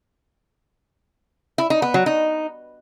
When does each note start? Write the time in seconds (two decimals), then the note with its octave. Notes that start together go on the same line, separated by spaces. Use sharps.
1.58 E4
1.70 D#4
1.82 B3
1.94 F#3
2.06 D#4